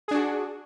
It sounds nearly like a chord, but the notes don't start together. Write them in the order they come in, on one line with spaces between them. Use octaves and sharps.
G#4 D4 F#4